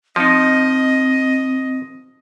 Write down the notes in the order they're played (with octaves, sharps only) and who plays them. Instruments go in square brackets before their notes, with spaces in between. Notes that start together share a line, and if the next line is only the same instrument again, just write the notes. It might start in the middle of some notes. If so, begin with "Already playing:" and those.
[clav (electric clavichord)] F3 D#4 [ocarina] C4 [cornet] D#5